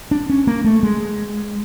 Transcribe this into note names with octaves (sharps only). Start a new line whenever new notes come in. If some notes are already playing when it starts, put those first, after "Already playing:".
D4
C#4
A#3
A3
G#3